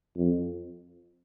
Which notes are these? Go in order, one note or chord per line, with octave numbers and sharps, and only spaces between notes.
F2